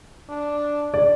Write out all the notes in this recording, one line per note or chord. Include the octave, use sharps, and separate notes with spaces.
D4
D5